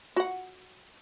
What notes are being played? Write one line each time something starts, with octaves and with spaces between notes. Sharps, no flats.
F#4 F#5